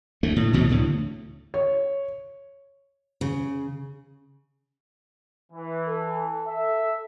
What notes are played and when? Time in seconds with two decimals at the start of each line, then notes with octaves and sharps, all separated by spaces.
0.23 D2 A3
0.36 A2
0.53 C#2 B2 E3 F#3
0.69 D2 A2 D3
1.54 C#5
3.21 C#3
5.52 E3
5.88 A4
6.48 E5